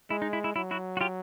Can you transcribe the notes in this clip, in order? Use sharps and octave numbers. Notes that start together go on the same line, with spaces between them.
G#3 E4
D#4
E4
E4
F#3 E4
E4 F#4
F#4
F4 G4